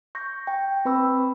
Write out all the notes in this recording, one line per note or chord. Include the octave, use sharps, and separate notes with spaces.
C#6 G6 A#6
G5
C4 B4 B5 C#6 E6